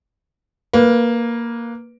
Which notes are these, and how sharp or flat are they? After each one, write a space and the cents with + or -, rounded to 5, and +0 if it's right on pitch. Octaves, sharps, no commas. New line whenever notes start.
A#3 +0 B4 -15